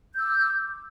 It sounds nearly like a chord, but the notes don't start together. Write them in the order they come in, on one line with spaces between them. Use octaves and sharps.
G6 E6 D6